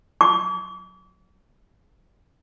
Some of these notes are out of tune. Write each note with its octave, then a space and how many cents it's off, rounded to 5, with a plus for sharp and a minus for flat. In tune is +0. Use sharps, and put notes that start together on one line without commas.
D6 -40